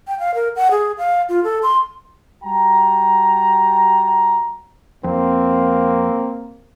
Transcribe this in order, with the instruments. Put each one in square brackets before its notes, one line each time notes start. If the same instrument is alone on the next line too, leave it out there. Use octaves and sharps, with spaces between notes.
[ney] G5
F5
A#4
F#5
G#4
F5
F4
A4
C6
[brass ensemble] G3 F#4 G5 A5 A#5
[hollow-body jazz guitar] F2 [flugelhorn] A#3 [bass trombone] C4